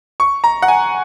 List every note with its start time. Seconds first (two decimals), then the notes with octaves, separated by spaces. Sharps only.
0.20 C#6
0.44 A#5
0.62 F#5
0.68 G#5